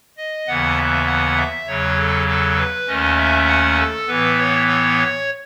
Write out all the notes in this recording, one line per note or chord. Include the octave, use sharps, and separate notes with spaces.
D#5
D#2 C#3 E3 B3 F#5
E5
F#5
E5
E2 C#3 F#3 C#5
A4
A4
B4
D#2 D#3 A3 C#4 D#5
E5
F#5
A4
A2 E3 B3 B4
C#5
C#5